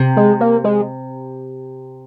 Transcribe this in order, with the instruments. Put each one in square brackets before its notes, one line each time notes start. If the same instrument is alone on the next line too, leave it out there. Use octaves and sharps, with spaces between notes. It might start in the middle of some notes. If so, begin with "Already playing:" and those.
Already playing: [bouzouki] C3
[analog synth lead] G#3
A#3
G#3